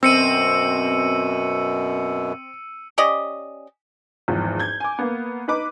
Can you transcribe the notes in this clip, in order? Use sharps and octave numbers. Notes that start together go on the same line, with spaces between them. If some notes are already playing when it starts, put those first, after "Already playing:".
F#2 B2 C4 E6 C#7 D#7
C#4 G4 D5 D#5
G#1 E2 F3
G6 G#6
G#5 D6
A#3 B3
D#4 B4 D6